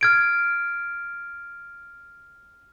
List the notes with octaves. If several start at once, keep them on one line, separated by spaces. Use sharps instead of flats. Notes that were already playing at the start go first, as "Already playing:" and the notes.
F6 G#6 D7